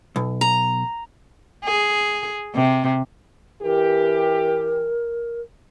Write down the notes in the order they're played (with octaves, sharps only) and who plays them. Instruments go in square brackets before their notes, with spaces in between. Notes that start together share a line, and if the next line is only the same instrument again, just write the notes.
[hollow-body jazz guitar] B1
[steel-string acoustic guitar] A#5
[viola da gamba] G#4
C3
[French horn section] E3 G4 [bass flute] A#4